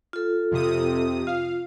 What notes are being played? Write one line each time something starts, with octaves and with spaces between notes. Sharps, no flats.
F4 A4
F2 C3 D#6
F4 F5